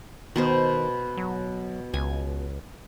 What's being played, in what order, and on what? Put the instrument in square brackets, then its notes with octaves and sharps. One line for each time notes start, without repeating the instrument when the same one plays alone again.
[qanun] B2 B3 C5 [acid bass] D#3
[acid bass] F#3
[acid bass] C#2 [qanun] G#5